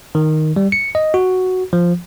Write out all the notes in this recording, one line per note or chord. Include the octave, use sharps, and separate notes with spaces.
D#3
G3
C#7
D#5
F#4
F3